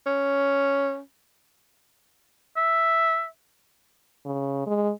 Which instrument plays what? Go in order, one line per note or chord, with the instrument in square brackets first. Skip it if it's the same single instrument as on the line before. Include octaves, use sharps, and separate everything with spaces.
[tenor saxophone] C#4
[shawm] E5
[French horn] C#3
G#3